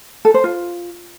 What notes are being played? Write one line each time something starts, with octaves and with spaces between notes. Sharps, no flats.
A4
C5
F4